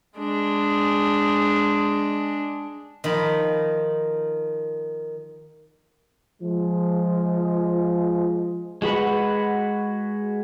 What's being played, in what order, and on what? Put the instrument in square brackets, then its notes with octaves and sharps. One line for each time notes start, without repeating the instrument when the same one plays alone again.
[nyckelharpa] G#3 D4
[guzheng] D#3 F3 B5
[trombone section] F3 G#3
[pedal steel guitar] G#3 F#4 B4 F#5